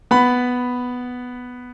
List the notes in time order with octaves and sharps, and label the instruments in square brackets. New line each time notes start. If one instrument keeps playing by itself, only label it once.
[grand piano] B3 B5